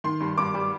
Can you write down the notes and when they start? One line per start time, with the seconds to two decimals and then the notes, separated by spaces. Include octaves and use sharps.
0.04 D#3 C6
0.20 G2
0.38 G2 D6
0.54 G3